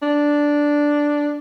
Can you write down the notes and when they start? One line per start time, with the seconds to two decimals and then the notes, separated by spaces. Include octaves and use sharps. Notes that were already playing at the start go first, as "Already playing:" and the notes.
0.02 D4